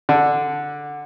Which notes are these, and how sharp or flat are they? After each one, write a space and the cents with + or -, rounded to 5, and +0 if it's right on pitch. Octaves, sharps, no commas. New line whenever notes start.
D3 +0 D5 +5